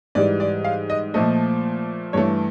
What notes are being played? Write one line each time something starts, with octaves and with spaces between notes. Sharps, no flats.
G#2 E3 G3 D5
D5
F5
D#5
A#2 F3 A3 D#5
G2 E3 A3 C#5